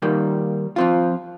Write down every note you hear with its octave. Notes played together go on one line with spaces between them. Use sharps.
D#3 G3 A#3
F3 C4 F4